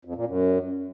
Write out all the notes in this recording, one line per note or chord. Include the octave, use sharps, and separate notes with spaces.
F2
A#2
F#2